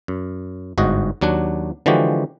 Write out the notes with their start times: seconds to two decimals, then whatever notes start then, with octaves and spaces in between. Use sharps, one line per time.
0.08 F#2
0.78 G1 G#2 F#4 D#5
1.21 D#2 F#3 D4 F#5
1.86 D3 E3 F3 G#3 F#4 G4